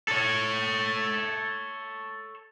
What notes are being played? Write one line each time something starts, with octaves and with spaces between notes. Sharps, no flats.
A4 C#5